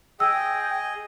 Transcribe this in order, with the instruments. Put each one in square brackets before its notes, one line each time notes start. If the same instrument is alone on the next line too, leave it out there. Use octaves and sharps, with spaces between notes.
[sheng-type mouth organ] G#4 D#5 [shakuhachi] G5 [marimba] E6